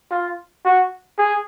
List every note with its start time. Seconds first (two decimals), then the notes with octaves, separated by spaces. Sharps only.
0.11 F4
0.65 F#4
1.18 G#4